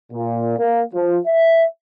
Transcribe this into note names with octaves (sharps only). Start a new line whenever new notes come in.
A#2
A#3
F3
E5